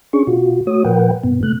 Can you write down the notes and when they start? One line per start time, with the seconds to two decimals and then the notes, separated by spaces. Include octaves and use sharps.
0.13 C#4 D4 G#4 C#6
0.27 B2 F4 F#4
0.67 A3 F#4 C#5 D#6
0.85 A#2 F3 A#4 B4 F#5 G5
1.24 G2 B2 B3
1.43 C3 A3 F#6